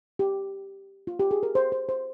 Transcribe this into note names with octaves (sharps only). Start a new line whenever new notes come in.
G4
F4
G4
G#4
A#4
C5
C5
C5